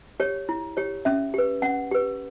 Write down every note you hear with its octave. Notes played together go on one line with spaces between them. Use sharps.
G4 C#5
E4
G4 C#5
C#4 E5
G4 B4
C#4 F#5
G4 B4